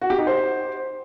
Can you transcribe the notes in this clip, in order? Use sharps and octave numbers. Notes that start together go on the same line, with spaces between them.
F#4
G4
D#4
C5